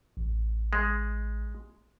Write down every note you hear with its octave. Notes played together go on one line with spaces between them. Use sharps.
A1
G#3